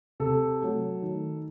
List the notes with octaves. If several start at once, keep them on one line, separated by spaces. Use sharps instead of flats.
C3 A4
F#3 A3
D#3